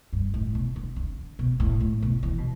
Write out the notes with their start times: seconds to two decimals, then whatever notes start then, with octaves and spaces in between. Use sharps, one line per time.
0.13 G2
0.34 A2
0.55 B2
0.76 D3
0.96 D3
1.39 B2
1.60 A2
1.80 A2
2.02 B2
2.23 E3
2.38 B2